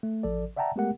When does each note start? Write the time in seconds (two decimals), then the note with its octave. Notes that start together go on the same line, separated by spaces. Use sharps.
0.03 A3
0.23 A1 F3 A4 D5
0.57 D5 E5 F#5 G5 A5 A#5
0.76 G#3 A3 B3 G4 A#4 F#5